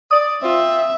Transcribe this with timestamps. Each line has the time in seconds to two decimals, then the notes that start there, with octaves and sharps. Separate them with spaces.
0.11 D5 D#6
0.43 C4 F4 E5